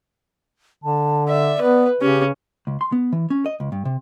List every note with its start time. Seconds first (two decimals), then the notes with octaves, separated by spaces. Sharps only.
0.84 D3 A5
1.28 D5 E5
1.61 B3 B4
2.01 C#3 C#4 G4
2.67 C#2
2.81 C6
2.92 B3
3.13 E3
3.30 C#4
3.46 D#5
3.60 C#2
3.72 G2
3.85 C3